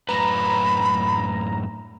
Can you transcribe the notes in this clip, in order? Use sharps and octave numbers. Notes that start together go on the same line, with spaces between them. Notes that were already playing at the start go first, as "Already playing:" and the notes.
F#2 A2 B4 A#5 B5